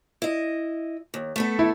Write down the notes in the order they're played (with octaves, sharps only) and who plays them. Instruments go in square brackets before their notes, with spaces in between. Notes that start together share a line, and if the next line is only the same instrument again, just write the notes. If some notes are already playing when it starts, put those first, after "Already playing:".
[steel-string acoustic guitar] E4 D#5
D#2
A3 B3 A4
[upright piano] E4